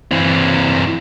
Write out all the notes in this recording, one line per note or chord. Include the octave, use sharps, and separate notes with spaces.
E3 C4